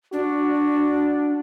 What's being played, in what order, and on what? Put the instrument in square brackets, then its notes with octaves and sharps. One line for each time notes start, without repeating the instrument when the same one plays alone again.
[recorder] D4 [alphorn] F#4